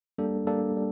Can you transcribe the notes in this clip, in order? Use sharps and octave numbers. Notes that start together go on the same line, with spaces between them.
G3 A#3 D4 A4
G3 A#3 D4 A4
G3